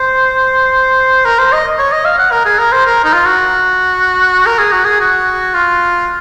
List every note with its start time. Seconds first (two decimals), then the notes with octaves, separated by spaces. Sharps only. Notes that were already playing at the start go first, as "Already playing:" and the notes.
Already playing: C5
1.25 A#4
1.39 C5
1.52 D#5
1.78 C#5
1.92 D#5
2.05 F5
2.18 F#5
2.32 A#4
2.45 G#4
2.58 A#4
2.72 C5
2.86 A#4
3.04 D#4
3.13 F4
3.26 F#4
4.46 A#4
4.59 G#4
4.72 F#4
4.85 G#4
5.00 F#4
5.54 F4